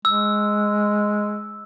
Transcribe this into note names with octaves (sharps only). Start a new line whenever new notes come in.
G#3 E6